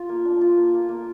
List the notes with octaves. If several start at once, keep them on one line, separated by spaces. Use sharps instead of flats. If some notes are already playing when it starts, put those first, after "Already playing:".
Already playing: F4
A#3
D4
F4
A#3
A#3
A#3